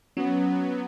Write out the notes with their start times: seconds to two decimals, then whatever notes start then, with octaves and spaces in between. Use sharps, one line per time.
0.17 F#3 B3 C#4